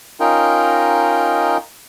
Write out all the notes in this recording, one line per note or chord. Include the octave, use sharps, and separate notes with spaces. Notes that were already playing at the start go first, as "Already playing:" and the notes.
C#4 D#4 F4 A#4 D#5 G5